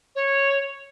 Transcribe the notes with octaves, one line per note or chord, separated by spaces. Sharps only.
C#5